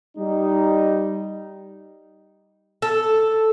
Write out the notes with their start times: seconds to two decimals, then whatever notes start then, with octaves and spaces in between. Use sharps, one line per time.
0.18 G3 D#4
2.82 A4